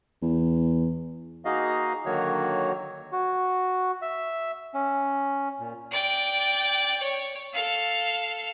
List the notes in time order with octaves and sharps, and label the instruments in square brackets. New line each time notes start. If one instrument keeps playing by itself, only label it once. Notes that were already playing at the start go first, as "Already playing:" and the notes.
[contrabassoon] E2
[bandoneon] A#3 D#4 F#4 G#4 D#5 F5
D3 D#3 F#3 A#3 F#4 C#5
F#4
E5
C#4
A#2
[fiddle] D5 G5
C#5
A4 F5